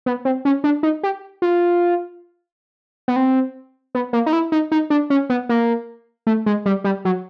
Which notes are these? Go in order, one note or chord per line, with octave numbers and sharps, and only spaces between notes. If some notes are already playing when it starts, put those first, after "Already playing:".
B3
C4
C#4
D4
D#4
G4
F4
B3
C4
B3
A#3
D#4
E4
D#4
D#4
D4
C#4
B3
A#3
A3
G#3
G3
G3
F#3